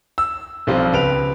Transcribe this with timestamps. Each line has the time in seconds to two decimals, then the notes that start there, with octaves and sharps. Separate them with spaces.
0.18 E6
0.67 B1 F3 G3 C4 F4
0.93 C#2 B4 D7 F7